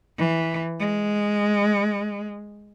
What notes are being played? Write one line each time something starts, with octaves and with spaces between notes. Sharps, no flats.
E3
G#3